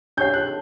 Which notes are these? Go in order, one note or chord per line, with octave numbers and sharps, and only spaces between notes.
D4 G4 C#5 F#5 G6
F#6